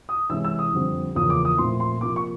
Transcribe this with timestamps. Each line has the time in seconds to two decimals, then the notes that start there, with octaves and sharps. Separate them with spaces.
0.09 D#6
0.29 C3 E3 G#3 C#4 E6
0.44 E6
0.59 D#6
0.73 F2 D3 G3 C4
1.15 E2 C#3 F3 A#3 D#6
1.30 D6
1.45 D#6
1.58 A#2 F3 A3 C4 C6
1.80 C6
2.01 C3 F3 A#3 D6
2.16 C#6